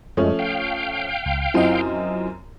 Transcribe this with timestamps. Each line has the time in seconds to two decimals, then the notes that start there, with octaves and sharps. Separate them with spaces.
0.17 F#2 F3 G#3 A3 C#4
0.39 F5 G5
1.26 C#2
1.54 F#2 C4 E4 F4 D#5